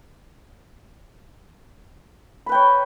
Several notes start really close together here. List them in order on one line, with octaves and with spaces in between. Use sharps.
B5 B4 G5 C#5